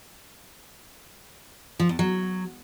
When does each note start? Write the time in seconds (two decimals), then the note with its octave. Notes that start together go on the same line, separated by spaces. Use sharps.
1.80 F3
1.89 E2
1.99 F#3